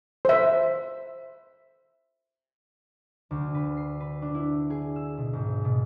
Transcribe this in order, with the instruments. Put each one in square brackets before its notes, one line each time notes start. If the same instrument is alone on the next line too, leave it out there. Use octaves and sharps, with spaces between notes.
[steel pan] C5 E5
[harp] D2
B4
C7
B4
D4
E4
G#4
E6
B2
G#1
B2